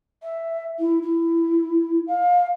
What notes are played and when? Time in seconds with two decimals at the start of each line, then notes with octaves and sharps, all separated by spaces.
0.23 E5
0.79 E4
1.02 E4
2.07 F5